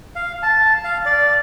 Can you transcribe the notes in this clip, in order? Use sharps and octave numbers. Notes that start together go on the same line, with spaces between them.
F5
A5
F5
D5